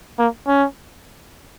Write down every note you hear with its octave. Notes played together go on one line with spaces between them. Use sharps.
A#3
C#4